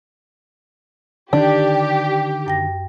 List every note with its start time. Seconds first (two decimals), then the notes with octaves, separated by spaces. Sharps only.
1.33 D3 D#3 D4 G4
2.46 F#2 G5 A#6